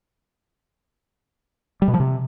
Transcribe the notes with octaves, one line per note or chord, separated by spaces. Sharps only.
G3
B2
F3
C3